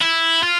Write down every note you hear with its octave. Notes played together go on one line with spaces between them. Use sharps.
E4
F4